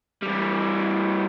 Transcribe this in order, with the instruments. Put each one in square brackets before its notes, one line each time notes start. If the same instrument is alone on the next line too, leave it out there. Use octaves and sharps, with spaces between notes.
[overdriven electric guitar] E3 G3